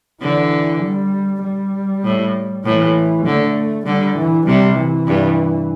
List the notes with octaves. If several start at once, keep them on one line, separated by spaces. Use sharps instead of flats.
D3 E3
G3
G3
A2
A2 E3
D3 A3
D3 G3
E3
C3 G3
E3
G2